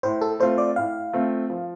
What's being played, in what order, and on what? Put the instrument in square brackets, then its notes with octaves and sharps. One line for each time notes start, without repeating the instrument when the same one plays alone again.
[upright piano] A2 [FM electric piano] C5
[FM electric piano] A4
[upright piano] A3 C4 F4 [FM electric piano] C5
[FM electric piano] D5
[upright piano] A2 [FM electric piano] F5
[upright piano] A3 C4 F4
F3